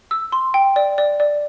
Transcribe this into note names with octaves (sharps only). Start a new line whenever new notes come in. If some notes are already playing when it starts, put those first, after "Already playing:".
E6
C6
G5
D5
D5
D5